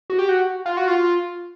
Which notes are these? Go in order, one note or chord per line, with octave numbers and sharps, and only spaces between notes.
F#4
G4
F#4
F4
F#4
F4